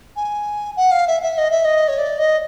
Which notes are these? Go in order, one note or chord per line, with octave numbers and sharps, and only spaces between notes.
G#5
F#5
F5
E5
E5
D#5
E5
D#5
C#5
D5
D#5